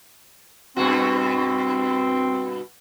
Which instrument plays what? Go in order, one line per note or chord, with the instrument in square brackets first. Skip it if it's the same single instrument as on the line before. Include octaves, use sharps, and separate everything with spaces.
[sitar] G2 B2 F#4 [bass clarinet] C4